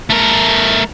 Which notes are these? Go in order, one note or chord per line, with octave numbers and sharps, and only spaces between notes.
A3 A#4